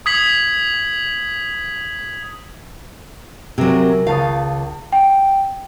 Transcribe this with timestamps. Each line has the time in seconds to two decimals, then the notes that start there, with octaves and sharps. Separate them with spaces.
0.06 D#6 G#6 B6 F#7
3.58 C3 F#3 G#4 A#4
4.07 C#2 F5 A5 D#6
4.92 G5